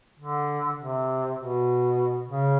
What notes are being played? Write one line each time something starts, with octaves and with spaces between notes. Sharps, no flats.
D3
C3
B2
C#3